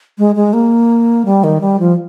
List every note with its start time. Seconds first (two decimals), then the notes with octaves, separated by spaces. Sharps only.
0.18 G#3
0.36 G#3
0.53 A#3
1.25 G3
1.44 D#3
1.61 G3
1.80 F3